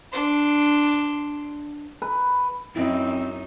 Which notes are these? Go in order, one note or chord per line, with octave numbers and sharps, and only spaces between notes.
D4 C6
B4
F#2 C4 D#4 E4 D#5